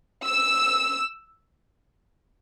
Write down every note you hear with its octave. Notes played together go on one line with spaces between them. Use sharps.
E6